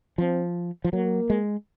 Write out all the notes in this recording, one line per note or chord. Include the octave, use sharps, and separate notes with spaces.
F3 C4
F3
F#3 A#3
G#3